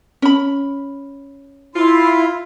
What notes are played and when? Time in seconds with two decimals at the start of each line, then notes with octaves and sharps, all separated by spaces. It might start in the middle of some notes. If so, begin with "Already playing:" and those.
0.22 C#4 B5
1.75 E4 F4 C6